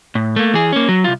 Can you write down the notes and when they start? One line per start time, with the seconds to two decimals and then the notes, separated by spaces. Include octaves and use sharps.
0.15 A2
0.36 A3 A#3
0.54 E3 G#4
0.72 A#3 C#4
0.89 F#3
1.04 C2 F4